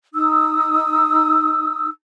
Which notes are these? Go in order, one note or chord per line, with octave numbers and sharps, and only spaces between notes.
D#4 D#6 E6